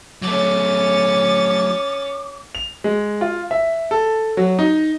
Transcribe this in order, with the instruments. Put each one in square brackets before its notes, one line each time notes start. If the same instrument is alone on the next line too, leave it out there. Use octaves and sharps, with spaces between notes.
[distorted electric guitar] F#3 A3 [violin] C#4 A6 [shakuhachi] D6
[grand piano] F7
G#3
F4
E5
A4
F#3
D#4